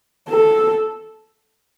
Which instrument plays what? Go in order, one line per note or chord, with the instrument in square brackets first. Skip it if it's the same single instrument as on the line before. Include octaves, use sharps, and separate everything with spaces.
[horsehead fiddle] A4